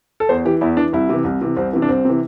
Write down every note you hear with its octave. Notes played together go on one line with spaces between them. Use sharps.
A4
E2 C5
E3 G4
E2 E4
E3 D4
C2 E4
C3 E3
C2
C3 E3
C2 C4
C3 E3
D4
C2 C4
C3 E3